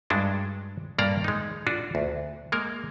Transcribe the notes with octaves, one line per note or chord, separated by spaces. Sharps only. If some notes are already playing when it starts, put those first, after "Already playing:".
G2 G#3 D4 F#4
G2 A#3 D5 F5 A#5
G#3 D#4
D4 F4 F#4
D2
G#3 A#3 A#4